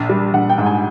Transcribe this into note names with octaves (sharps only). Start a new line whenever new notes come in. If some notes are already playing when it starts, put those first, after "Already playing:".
Already playing: A#1
G3
A#1 F#5
G5
G#2
G#5